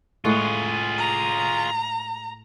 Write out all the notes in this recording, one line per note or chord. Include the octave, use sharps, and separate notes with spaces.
A2 G#3 F4 G#4 F#5
A#5